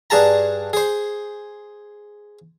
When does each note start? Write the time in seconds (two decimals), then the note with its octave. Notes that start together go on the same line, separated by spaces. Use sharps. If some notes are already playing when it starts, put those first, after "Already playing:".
0.10 G2 D4 G#4 A5 A#5
0.73 G#4 C5